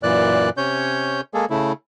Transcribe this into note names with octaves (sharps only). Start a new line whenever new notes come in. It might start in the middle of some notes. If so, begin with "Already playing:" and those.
F#2 A#2 E3 D5 F#6
C3 C#4 C#5 G6
G#3 A#3 G#4 A4
C#3 A3 E4